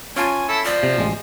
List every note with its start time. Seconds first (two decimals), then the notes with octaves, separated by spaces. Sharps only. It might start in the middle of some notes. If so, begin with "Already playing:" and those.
0.16 C#4 F4 F5 G#5 A5
0.48 E4 A4
0.65 F3 D5
0.83 C3
0.98 A1 G#3